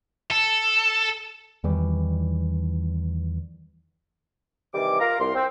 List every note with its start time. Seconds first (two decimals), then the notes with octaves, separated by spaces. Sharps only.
0.31 A4
1.64 E2 D#3 E3 G3
4.73 C3 D#3 E3 G3 D6
5.00 F4 A#4 F5 A#5
5.19 C2 C6
5.35 C4